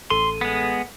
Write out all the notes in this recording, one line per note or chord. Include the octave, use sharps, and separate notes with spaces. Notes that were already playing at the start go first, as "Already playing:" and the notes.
A1 A4 C6 D#7
G#3 B3